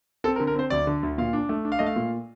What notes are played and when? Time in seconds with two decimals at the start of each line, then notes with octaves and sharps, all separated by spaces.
0.24 C4 A4
0.36 A#4
0.40 D3
0.47 A#4
0.55 C4 C5
0.70 D2 D5
0.87 D3
1.03 D2
1.18 A#2 F5
1.33 D4
1.49 A3
1.65 D4
1.72 F5
1.79 A3 D#5
1.86 F5
1.96 A#2